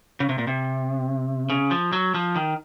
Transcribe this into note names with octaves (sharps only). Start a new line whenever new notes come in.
C#3
C3
A#2
C3
C#3
F3
F#3
F3
D#3